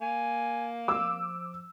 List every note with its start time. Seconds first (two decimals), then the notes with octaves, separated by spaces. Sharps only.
0.01 A#3 G#5
0.88 F3 D6 E6